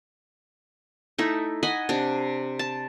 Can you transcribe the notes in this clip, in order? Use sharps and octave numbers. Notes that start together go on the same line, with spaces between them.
A3 D#4 E4
D#5 F#5 G#5 B5
C3 D4
A5